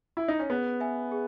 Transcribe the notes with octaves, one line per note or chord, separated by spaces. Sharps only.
E4
D#4
C#4
B3 G#4
B4 E5 G#5
G#4